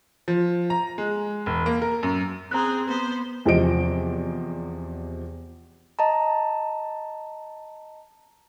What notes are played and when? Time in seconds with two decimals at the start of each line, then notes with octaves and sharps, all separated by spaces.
0.28 F3
0.70 A#5
0.98 G#3
1.46 E1
1.66 A#3
1.82 A#4
2.03 F#2
2.51 C4 G#4 A#5 F#6
2.88 B3 C5
3.45 E2 C3 F3 C4 D#5 D7
5.99 D#5 A5 A#5